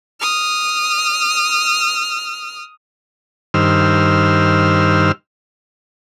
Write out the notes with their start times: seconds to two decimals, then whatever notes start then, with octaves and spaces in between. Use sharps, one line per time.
0.21 D#6 F6
3.54 G2 D#3 C5 E6 F6